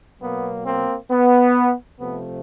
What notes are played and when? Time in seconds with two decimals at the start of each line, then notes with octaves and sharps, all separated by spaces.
0.21 B2 F#3 A#3 B3
0.65 A#3 C4
1.10 B3
1.99 C3 F3 A3 B3